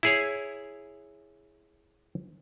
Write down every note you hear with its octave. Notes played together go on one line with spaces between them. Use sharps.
E4 G#4 C#5